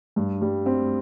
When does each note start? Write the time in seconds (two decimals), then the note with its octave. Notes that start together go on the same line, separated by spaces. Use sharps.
0.16 G2
0.41 G3
0.66 C4